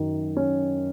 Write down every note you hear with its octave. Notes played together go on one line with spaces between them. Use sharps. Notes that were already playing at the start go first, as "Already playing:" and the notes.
Already playing: F#2 D#3
C#4